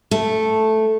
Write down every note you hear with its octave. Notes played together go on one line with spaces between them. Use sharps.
A3